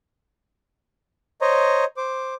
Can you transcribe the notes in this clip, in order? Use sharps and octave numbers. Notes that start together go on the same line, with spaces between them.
C5 C#5 D#5 A#5
C5 D6